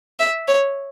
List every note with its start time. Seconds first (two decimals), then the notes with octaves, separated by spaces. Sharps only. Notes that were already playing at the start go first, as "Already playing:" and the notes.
0.20 E5
0.48 C#5